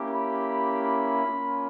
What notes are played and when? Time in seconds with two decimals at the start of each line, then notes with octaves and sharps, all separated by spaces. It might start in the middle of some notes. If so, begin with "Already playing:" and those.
Already playing: A#3 C#4 E4 G4
0.10 B5
1.25 A#3 C#4 F4